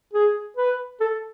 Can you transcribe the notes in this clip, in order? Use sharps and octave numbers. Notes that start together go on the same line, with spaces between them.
G#4
B4
A4